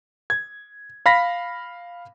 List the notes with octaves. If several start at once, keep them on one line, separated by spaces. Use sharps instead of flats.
G#6
F5 B5 A#6 B6